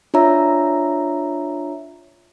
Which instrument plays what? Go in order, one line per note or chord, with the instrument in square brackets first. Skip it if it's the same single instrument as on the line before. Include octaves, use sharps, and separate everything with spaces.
[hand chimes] D4 F4 C#5 E5 A#5